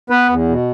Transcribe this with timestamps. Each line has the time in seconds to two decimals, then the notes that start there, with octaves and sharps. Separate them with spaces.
0.10 B3 B4
0.29 E2
0.48 B2